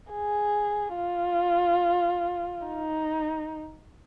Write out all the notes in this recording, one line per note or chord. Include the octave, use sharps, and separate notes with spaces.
G#4
F4
D#4